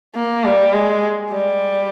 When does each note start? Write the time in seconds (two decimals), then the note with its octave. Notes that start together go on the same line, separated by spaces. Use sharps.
0.15 A#3
0.45 G3
0.73 G#3
1.32 G3